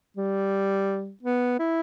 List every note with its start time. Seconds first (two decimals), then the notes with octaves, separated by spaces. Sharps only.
0.17 G3
1.23 B3
1.59 E4